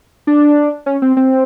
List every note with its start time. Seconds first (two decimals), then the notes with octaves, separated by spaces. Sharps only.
0.27 D4
0.86 C#4
1.02 C4
1.17 C4